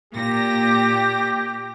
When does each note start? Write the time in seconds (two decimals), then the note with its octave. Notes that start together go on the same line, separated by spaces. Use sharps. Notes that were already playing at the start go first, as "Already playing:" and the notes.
0.13 A#2 G4 A#6